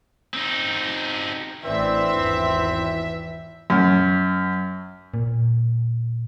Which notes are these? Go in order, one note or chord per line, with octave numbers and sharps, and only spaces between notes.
C4 D#4
A1 E3 C4 D4 E5
G#1 E2
F#2
A#2